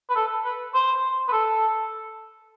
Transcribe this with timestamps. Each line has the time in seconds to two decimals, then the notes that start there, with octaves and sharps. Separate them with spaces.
0.09 B4
0.16 A4
0.44 B4
0.74 C5
1.28 B4
1.32 A4